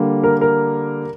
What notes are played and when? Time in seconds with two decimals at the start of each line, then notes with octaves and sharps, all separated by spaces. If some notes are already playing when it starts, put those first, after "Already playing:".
Already playing: D3 G3 A#3
0.24 A#4
0.41 A#4